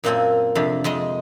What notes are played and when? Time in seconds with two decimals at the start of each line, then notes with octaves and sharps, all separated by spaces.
0.04 F#2 A#2 A#3 C4 A4 G#5
0.55 F2 C3 D4
0.84 F2 G#3 D#5